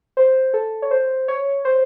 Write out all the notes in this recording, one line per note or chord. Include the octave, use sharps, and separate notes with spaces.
C5
A4
C#5
C5
C#5
C5